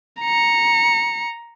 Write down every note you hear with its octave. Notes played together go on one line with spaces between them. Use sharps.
A#5 C#7